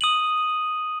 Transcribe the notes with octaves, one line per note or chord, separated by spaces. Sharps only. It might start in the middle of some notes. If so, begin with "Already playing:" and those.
D#6 D#7 F#7